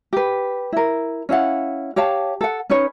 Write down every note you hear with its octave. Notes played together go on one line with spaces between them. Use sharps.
G4 B4
E4 A#4
C#4 E4 F5 F#5
G4 C#5 F5 A5
A4 F#5
C#4 D#4 B4 C#5